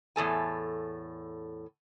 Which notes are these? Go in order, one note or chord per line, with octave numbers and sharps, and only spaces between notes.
E2 A2 A4 G#5